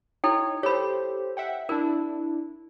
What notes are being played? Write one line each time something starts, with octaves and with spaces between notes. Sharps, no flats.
D#4 E4 A4 C#5 G5
G4 A4 C5 C#5 B5
E5 F#5 G5
D4 E4 A#4